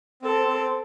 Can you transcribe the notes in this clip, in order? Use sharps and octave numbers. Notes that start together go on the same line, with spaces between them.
C4 A4
C4